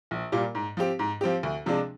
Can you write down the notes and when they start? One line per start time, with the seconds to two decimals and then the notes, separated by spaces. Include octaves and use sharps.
0.11 A#1
0.32 A#2 G3 A#3 F4
0.55 G#2
0.77 F3 C4 G4
0.99 G#2
1.21 F3 C4 G4
1.43 D2
1.66 C3 F3 G#3 D4